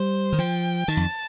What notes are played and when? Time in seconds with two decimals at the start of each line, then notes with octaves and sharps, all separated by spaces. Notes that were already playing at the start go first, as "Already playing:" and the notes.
Already playing: G3 C5
0.33 D#3
0.38 F3 G5
0.88 D#3 A5
0.97 F2